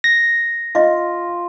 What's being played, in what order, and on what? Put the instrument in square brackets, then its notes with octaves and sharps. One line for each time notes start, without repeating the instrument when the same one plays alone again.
[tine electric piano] A#6
[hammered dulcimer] F4 [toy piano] D#5 F5